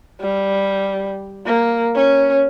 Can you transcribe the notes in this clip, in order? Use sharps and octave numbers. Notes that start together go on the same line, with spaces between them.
G3
A#3
C#4